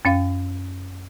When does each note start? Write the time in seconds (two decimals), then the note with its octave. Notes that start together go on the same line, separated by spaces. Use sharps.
0.05 F#2 C#4 F5